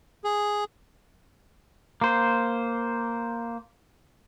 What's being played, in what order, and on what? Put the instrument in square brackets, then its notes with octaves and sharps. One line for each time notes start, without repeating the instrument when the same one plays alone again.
[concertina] G#4
[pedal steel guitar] A#3 C5